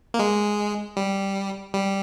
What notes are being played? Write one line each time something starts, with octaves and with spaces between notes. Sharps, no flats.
A#3
G#3
G3
G3